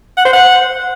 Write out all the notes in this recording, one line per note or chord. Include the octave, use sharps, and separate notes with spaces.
F#5
C5
F#5